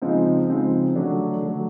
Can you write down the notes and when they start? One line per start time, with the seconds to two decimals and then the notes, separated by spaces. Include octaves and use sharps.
0.02 C#3 F3 G#3 C4 D#4
0.49 C#3 F3 G#3 C4 D#4
0.96 D3 F#3 A3 D4
1.42 D3 F#3 A3 D4